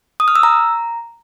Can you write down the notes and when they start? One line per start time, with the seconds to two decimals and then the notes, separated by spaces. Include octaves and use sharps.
0.20 D#6
0.28 F6
0.36 E6
0.43 A#5